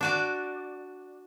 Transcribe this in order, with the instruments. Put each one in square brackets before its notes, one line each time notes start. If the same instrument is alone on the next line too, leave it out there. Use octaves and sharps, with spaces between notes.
[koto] D4 F#4 D5